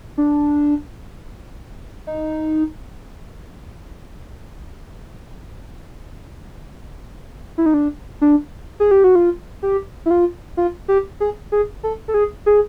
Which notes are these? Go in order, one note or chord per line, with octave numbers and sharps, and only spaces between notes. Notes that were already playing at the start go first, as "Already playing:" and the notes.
D4
D#4
E4
D#4
D4
D4
G#4
G4
F#4
F4
G4
E4
F4
F4
G4
G#4
G#4
A4
A4
G#4
G#4